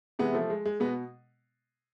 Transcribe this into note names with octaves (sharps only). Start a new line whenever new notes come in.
C3 E3 G#3 B3
F3 A3
G#3
G#3
B2 G#3 B3